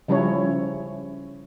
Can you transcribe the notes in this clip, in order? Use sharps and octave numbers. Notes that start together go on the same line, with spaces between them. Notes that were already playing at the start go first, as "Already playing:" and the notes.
C#3 F3 G3 C#4 E4 C#5